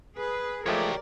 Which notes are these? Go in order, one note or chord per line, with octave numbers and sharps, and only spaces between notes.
G#4 B4
F3 G#3 A3 G4 A#4 C#5 D5